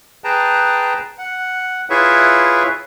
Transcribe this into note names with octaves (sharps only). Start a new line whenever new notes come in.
G#4 B4 G5 A5 A#5
F#5
E4 F4 G#4 B4 C#5 E5